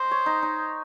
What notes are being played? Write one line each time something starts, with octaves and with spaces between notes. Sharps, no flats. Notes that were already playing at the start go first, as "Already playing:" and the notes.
Already playing: C5 D#5
C#5
D#4
D#4